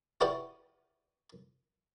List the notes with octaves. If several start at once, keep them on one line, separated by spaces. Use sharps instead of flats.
E4 F#4 G4 B4 D5 C#6